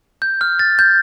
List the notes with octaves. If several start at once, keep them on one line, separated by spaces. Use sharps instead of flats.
G6
F6
A6
G6